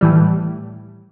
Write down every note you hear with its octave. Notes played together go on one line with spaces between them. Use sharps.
A2 E3 G3